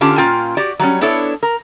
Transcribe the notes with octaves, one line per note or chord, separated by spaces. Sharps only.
D3 C#4 F4 G4 A5
A#2 C#4 F4 G5
F#4 G4 D5
F#3 G3 C#4
B3 D4 E4 A4 C#5
A#4